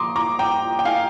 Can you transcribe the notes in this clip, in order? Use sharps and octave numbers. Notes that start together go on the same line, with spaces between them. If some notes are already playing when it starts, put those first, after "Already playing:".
Already playing: A#2 F3 A#3 A#5 C6 D6 D#6
A#5 D6
G5 A#5
G5
F5 G#5